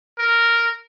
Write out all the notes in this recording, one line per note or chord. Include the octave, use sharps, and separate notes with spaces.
A#4